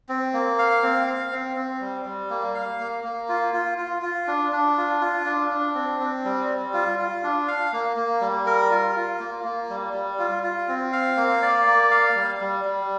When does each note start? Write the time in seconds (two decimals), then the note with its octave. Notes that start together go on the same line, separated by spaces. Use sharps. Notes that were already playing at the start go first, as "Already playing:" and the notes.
0.09 C4
0.33 A#3
0.59 F5
0.83 C4
1.07 F5
1.32 C4
1.56 C4
1.81 G3
2.05 G3
2.30 A#3
2.54 F5
2.80 A#3
3.04 A#3
3.29 F4
3.53 F4
3.78 F4
4.02 F4
4.27 D4
4.52 D4
4.77 F4
5.01 F4
5.25 D4
5.50 D4
5.75 C4
6.00 C4
6.25 G3
6.49 G3
6.74 F4
6.99 F4
7.23 D4
7.47 F5
7.73 A#3
7.97 A#3
8.21 G3
8.46 A#4
8.70 F4
8.96 F4
9.20 A#3
9.44 A#3
9.70 G3
9.93 G3
10.19 F4
10.43 F4
10.68 C4
10.93 F5
11.17 A#3
11.42 D5
11.67 A#3
11.91 F5
12.16 G3
12.40 G3
12.65 G3